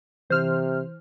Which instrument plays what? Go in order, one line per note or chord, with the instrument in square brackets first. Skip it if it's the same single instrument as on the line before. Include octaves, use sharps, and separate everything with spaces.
[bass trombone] C3 [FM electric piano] E3 [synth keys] C5 F6